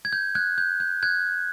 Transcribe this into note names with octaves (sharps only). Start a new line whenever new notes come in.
G#6
G6
F#6 G#6
G6
G6
F#6 G#6